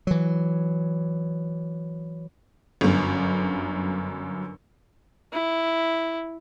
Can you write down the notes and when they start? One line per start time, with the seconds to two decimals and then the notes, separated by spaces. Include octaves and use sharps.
0.07 E3 F#3
2.81 G1 F#2
5.33 E4